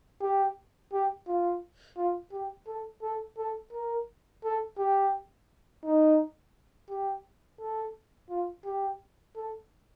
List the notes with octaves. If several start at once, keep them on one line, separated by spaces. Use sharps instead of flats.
G4
G4
F4
F4
G4
A4
A4
A4
A#4
A4
G4
D#4
G4
A4
F4
G4
A4